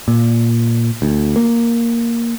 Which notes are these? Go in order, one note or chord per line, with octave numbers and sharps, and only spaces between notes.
A#2
D2
A#3